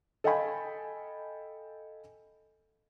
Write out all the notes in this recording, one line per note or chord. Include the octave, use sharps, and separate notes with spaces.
A4 D#5 F5 G5 G#5 B5